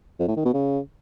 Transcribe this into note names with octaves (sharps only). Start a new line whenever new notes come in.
F2
A2
D#3
B2
C#3